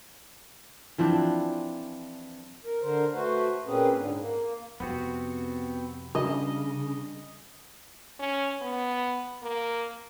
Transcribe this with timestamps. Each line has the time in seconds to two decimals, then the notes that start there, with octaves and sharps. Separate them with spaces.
0.98 E3 F3 C4 D4
2.65 A#4
2.81 D3 A#4 C5
3.13 A3 F#4 B4 C5
3.66 A#2 A#3 C4 C#4 G#4 B4
3.94 G#2 D3
4.19 A#3
4.80 F2 C3 B3 C4 F#4
6.15 C#3 G3 A3 D4 D#5
8.20 C#4
8.62 B3
9.43 A#3